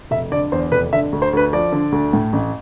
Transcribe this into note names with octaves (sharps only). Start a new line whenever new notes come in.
F1 E5
D3 D5
E2 C5
F1 B4
D3 E5
D2
C5
D2 B4
F3 D5
D3
D2
A2
A1